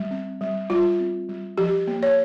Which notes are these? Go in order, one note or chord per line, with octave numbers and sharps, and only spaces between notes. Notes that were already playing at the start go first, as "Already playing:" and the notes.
Already playing: G3
C4
G3
G3 F4
C4
G3
F3 G4
A#3
C#5